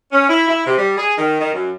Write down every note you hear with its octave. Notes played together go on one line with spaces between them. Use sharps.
C#4
E4
E4
C3
G3
G#4
D#3
D#3
F#2